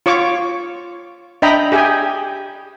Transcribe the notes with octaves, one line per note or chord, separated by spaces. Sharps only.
F4 C#5 C#6 D6
D4 D#5 E5 G5 A#5 B5
G4 G#4 E5 G5 G#5